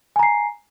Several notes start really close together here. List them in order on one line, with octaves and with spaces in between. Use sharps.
G#5 A#5 C7